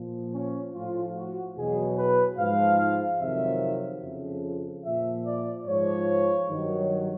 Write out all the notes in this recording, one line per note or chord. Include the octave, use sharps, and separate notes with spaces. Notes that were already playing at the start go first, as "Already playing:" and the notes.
Already playing: A#2 F3
C#4
A2 F3 F4
F#4
E2 B2 F#3 G#4
B4
G#2 F3 F5
F2 C3 D#3 F#3 E5
F2 C#3 F3
A#2 F3 E5
D5
G#2 F3 C#5
G2 D#3 F#3